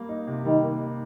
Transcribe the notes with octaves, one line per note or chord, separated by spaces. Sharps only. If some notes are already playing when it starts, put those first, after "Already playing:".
Already playing: G3 A#3
D#4
C3
D#3 G3
A#3
D#4